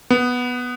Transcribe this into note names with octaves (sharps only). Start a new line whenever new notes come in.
B3